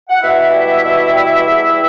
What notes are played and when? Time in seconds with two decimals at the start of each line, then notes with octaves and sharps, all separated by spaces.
0.10 F#5
0.20 B2 E4 E5
0.52 G3
0.83 B2
1.14 G3
1.44 E2